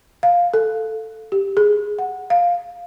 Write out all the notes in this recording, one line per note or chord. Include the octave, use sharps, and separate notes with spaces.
F5
A4
G4
G#4
F#5
F5